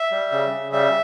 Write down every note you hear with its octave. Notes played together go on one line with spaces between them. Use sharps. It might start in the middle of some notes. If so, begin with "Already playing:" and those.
Already playing: E5
G3
C#3
C#3
G3 E5